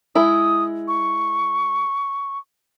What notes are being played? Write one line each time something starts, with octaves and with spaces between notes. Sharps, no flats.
G#3 E4 D#6
C#6